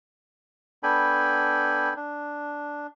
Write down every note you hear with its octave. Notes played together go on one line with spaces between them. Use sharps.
B3 D4 A4 G5 G#5 B5
D4